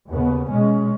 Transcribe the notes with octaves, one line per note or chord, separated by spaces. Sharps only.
D#2 C#3 B3
B2 G#3 C#4